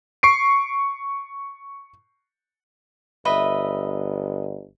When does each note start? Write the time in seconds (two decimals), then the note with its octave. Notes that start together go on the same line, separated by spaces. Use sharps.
0.23 C#6 C7 D7
3.25 G1 B4 D#5 E5